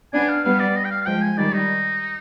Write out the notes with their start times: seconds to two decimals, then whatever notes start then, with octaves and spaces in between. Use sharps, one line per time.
0.14 B3 D4 G#5
0.29 F5
0.44 G3 B3 F5
0.60 D5
0.76 D#5
0.85 G5
0.91 F5
1.01 F5
1.06 F3 G#3 G5
1.22 G#5
1.37 D#3 G3 D5
1.53 D#4